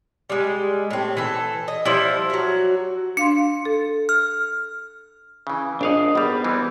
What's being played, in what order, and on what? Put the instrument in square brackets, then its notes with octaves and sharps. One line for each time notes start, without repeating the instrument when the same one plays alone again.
[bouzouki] G3 G#3
A2 C4
E3 A4
D#5
F3 G3 E4
F#3 F#4
[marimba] D4 F5 C6 [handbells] C#7
[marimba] A4
[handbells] F6
[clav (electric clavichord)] C#3 E3
[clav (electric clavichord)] A#1 F5 F#5 [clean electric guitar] D4 D#5
[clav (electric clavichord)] G#1 G3 [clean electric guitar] B3
[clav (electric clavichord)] E3 G3 C4